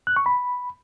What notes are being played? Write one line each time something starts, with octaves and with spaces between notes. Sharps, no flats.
F#6
C#6
B5